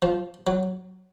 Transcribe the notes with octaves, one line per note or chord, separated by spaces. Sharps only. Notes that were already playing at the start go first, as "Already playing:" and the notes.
F3
F#3